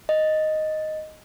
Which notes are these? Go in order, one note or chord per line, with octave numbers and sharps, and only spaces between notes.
D#5